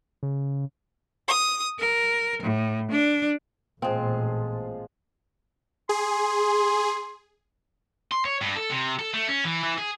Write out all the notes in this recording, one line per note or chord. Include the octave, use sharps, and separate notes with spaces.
C#3
D#6
A#4
A2
D4
A1 A#2 F3 G#3 C4
G#4 C6
C6
C#5
G2
A4
C3
A4
A3
C#4
E3
E3
G#4